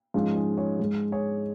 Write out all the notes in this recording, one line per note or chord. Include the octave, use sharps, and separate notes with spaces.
G#2 F3 G#3 C#4 F4
D#4 G#4
G#4 C#5
G#2 G#3
G#4 C#5